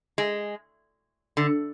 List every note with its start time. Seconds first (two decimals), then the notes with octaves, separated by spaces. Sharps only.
0.18 G#3
1.37 D3